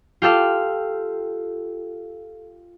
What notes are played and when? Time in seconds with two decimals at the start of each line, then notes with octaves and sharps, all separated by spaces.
0.22 F4 G4 A4 F5